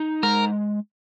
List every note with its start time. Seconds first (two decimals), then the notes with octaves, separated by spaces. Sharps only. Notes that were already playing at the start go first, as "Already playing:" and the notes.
Already playing: D#4
0.23 G#3 A#4